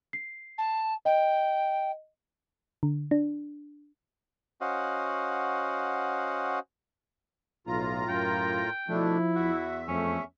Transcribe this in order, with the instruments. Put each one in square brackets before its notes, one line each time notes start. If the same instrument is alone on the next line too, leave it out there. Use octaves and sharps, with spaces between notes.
[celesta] C7
[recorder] A5
[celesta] D#5 [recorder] G5
[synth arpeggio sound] D3
D4
[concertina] C#4 F#4 C5 D#5 F5 F#5
[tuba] B1 [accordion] A2 F4 A#5
[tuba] F#2 [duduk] A#4 [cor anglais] G5
[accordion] B2 A3 D4 [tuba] F3 [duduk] E4
[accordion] E2 E5 [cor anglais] F#4
[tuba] F2 [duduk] A3 [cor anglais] C#4